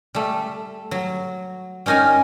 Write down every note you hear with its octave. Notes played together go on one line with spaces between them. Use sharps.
G3 A3
F#3
G3 C#4 D#4 A#4 G#5